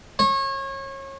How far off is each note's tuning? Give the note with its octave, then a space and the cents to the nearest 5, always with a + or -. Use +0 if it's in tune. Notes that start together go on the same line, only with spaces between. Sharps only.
C#5 -30